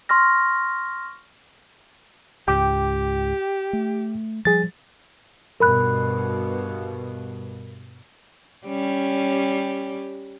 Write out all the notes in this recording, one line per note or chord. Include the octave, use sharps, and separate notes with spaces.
C6 C#6 F6 A#6
C#2 G#2 G4 G5 D6
A3
F3 G3 G#4 A6
G2 B2 A#4 B5 F#6
G3 C#4 G4